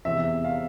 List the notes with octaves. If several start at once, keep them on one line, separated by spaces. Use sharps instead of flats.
E2 C3 E3 E5
F5